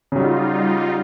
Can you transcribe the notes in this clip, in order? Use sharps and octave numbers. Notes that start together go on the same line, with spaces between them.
C#3 F#3 G3 D#4 F4